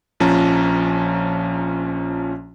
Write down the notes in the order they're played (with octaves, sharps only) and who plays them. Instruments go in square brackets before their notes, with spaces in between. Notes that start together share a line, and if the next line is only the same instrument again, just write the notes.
[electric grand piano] A#1 F3 C#4 A5 A#5